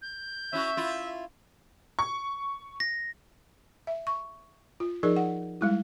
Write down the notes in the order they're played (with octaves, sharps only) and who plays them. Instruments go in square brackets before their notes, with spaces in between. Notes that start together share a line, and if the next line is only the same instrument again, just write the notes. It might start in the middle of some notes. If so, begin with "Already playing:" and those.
[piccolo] G6
[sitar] C#4 E4 F#4 [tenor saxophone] E5
[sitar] E4 F4
[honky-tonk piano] C#6
[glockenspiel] A#6
[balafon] E5
C#6
F4
F3 D#4 G#4 A#4 D5
F#5
G3 G#3 E4